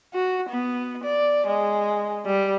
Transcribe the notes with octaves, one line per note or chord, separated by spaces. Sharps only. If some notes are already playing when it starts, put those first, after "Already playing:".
F#4
B3
D5
G#3
G3